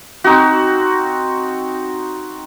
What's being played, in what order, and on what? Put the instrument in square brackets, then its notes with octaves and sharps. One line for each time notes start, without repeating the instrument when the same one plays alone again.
[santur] C4 D#4 F#4